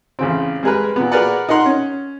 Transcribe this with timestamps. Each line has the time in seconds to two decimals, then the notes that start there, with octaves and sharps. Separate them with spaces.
0.19 A1 C#3 C4
0.63 G3 G#3 G#4 A#4 B4
0.96 A#2 B3
1.11 F#4 G#4 A#4 B4 D5 F#5
1.49 D#4 A#4 F#5 C6
1.66 C#4